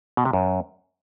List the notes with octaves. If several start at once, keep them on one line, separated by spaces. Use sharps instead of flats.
B2
C3
F#2